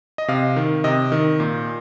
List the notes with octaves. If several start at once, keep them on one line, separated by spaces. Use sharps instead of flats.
D#5
C3 F5
D#3
C3 D#5
D#3
A#2